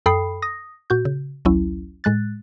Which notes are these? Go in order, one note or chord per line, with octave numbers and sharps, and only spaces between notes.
F#2 A4 G5 B5 D#6 C7
D#6 A#6
A#2 F#4 G6
C#3
A1 D2 F#3 C#4 E4
A2 G#3 F#6 A6